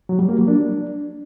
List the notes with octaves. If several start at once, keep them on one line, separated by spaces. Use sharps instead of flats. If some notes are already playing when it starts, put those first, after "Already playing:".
F#3
G3
A#3
F#3
D4